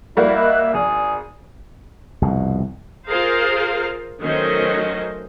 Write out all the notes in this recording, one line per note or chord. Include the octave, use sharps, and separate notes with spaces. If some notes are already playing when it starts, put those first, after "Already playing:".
G3 A#3 E4 F#4 D5
D#5 E5 B5 F#6
G#1 G#4 D5
C2 F2 B2
F4 G#4 A#4 C5 F5
D#3 F#3 A3 C#4 C5 D#5